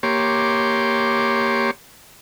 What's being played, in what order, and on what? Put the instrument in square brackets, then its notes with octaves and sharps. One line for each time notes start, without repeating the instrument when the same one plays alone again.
[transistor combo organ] A#3 G4 C#5 C6 D6